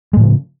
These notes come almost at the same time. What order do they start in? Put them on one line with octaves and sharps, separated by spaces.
G#3 A2 F3 C#3